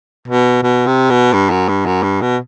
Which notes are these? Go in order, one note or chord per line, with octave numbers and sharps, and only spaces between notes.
B2
B2
C3
B2
G2
F#2
G2
F#2
G2
B2